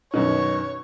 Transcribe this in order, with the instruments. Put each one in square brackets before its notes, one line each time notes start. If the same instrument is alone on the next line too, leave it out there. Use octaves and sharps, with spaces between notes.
[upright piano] F#2 B2 D#3 [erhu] C#5